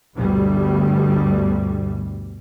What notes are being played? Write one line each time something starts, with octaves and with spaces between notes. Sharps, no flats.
G1 D2 G2 B2 G3